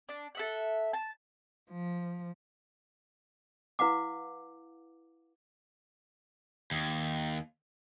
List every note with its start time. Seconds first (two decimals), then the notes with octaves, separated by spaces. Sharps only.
0.09 D4
0.35 A4 E5 F#5
0.93 A5
1.71 F3
3.79 E4 B4 F5 F#5 D6
6.71 D#2